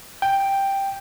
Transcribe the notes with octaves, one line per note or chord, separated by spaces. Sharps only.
G5